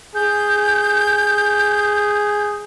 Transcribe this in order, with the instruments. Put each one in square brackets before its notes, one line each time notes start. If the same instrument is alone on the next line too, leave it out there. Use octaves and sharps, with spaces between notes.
[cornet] G#4 [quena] G6